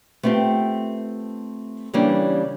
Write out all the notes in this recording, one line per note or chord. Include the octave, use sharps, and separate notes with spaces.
A3 B3 C4 F4 G4
C#3 E3 G3 A#3 C#4 D4